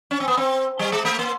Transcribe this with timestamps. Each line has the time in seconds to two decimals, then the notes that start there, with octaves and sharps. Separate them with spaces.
0.11 C#4
0.20 C4
0.28 B3
0.37 C4
0.79 G3
0.92 G#3
1.05 A3
1.19 A#3